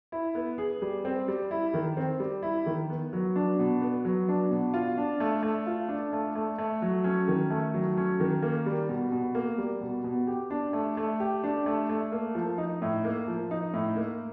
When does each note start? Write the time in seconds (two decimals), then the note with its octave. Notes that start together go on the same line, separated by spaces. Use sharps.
0.12 E4
0.35 B3
0.58 G#4
0.82 G3
1.05 C4
1.28 G3
1.51 E4
1.74 D#3
1.97 C4
2.20 G3
2.43 E4
2.66 D#3
2.90 B3
3.13 F#3
3.36 D4
3.59 B2
3.82 B3
4.05 F#3
4.28 D4
4.51 B2
4.74 F4
4.97 D4
5.20 A3
5.43 A3
5.66 F4
5.89 D4
6.13 A3
6.35 A3
6.58 A3
6.82 F#3
7.04 C#4
7.28 D#3
7.50 A3
7.74 F#3
7.97 C#4
8.20 D#3
8.43 A#3
8.66 G3
8.89 B2
9.12 B2
9.35 A#3
9.58 G3
9.81 B2
10.04 B2
10.27 G4
10.50 D4
10.73 A3
10.97 A3
11.20 G4
11.44 D4
11.66 A3
11.89 A3
12.12 A#3
12.35 F3
12.58 D#4
12.82 A2
13.05 A#3
13.28 F3
13.51 D#4
13.74 A2
13.96 A#3